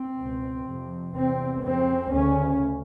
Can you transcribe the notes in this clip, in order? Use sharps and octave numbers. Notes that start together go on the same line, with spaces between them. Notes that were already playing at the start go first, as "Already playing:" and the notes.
Already playing: C4
C#2 B2
F2 C3
E2 C3 C4
F2 C#3 C4
D2 C#3 C#4